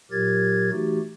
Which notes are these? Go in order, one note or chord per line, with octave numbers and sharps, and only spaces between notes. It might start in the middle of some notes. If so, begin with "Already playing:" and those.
A#2 F#3 G4 A#4 G#6 A6
E3 A3 D#4 F#4 G4